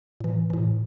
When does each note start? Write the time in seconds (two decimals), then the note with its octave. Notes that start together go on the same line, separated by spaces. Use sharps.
0.20 A2 E3
0.50 A2 E3